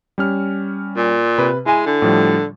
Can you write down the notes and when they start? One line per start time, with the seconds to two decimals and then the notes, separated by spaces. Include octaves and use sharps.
0.18 G3 C#4 F6
0.96 A#2
1.38 C3 B4
1.66 G#3 E4 G#5
1.86 D3
2.02 A2 F3 G3